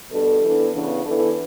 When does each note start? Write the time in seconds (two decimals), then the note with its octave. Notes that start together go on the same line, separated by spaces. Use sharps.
0.11 B2 G3 D4 A4
0.42 E3 B3 D4
0.72 C#3 E3 B3 D4 B4
1.02 E3 B3 D4 A4